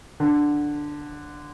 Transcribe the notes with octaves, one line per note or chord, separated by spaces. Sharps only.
D3